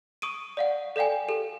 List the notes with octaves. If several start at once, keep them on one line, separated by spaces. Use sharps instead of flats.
C#6 D#6 D7 D#7
D5 F5 F#5
A4 D5 F5 G5 G#5
G4 A4